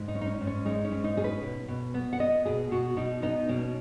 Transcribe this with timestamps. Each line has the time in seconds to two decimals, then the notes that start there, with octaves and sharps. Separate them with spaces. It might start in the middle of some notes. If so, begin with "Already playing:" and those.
Already playing: G#2
0.08 D#4
0.15 C#4
0.21 D#4
0.27 C#4
0.41 G#2
0.47 C#4
0.65 G#3 D#4
0.85 C#4
0.92 G#2
1.04 D#4
1.17 C#4 G#4
1.24 B4
1.43 B2
1.68 B2
1.94 B3
2.13 F#5
2.19 B3 D#5
2.45 B2 G#4
2.71 B2 F#4
2.97 B2 D#4
3.22 B3 D#4
3.49 B2 C#4